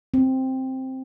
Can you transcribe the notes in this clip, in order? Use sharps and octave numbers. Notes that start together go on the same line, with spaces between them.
C4